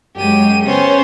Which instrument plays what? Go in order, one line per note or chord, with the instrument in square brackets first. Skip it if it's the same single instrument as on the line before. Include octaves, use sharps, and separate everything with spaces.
[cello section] F#2 G#3 [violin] G4 D#7
[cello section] C#3 B3 [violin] C#4 C5